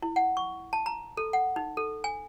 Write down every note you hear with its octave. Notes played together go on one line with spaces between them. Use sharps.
E4
F#5
C#6
A5
A#5
A4
F#5
D#4
A4
G#5